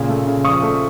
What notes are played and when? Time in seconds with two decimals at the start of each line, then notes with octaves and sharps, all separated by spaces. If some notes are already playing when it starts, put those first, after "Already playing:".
Already playing: A#2 C#3
0.09 A3
0.27 C#3
0.44 F3 C#6 D#6
0.62 A3